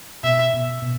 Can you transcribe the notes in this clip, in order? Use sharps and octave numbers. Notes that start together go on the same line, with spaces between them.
B2 E5
B2
B2